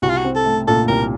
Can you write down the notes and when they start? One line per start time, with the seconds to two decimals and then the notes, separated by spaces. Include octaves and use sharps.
0.02 C2 F#4
0.10 F4
0.17 F#4
0.24 C4
0.36 A4
0.45 A3
0.67 A#2 A4
0.88 C2 A#4